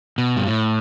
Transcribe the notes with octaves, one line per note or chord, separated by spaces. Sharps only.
B2
G2
A2